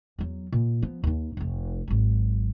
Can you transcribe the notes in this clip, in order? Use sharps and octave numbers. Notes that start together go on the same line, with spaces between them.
E2 F#3
A#2
F3 B3
D#2 D#4
F1 A3
G#1 F#3